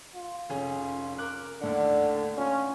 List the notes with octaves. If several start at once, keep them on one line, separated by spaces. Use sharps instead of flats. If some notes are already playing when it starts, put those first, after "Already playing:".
F4
F1 C#4 G#4
A#4 D6 F#6
D#2 A2 D3 D5 F#5
C#4 F4